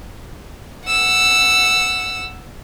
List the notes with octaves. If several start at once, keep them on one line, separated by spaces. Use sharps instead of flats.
F#5 E6